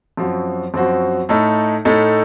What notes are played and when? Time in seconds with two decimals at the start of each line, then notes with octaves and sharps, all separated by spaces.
0.17 F#2 F3 C4 F#4
0.74 F#2 F3 C4 F#4
1.29 A2 A3 D#4 A4
1.85 A2 A3 D#4 A4